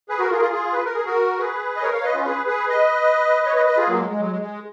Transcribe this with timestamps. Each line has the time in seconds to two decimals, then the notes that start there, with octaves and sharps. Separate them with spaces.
0.09 G#4 B4
0.19 F#4 A#4
0.31 F4 G#4
0.36 A#4
0.41 F4 G#4
0.52 F4 G#4
0.73 B4
0.85 A#4
0.95 G#4
1.06 F#4 A#4
1.39 G#4 B4
1.77 D#5
1.82 A#4 C#5
1.93 C#5 F5
2.04 B4 D#5
2.14 C#4 F4
2.25 G#4 B4
2.47 G#4 B4
2.69 B4 D#5
3.46 C#5
3.56 B4 D#5
3.66 B4 D#5
3.77 F4 G#4
3.88 F#3 A#3
3.98 G#3
4.09 G#3
4.20 F#3
4.31 G#3
4.42 G#3